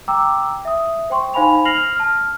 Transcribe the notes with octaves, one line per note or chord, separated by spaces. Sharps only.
G5 A#5 D6 E6
E5 D#6
C5 G5 C6 C#6
D#4 C5 F5 G#5 B5 F7
F6 A#6 C7 F7 F#7
A5 F6